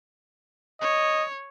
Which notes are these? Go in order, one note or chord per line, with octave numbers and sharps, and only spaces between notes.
C#5 D#5